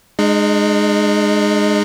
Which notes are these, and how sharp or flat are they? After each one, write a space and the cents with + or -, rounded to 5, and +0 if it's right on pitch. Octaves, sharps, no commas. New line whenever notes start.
G#3 +0 D#4 -40